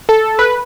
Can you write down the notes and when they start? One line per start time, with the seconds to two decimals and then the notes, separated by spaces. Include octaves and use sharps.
0.09 A4
0.39 B4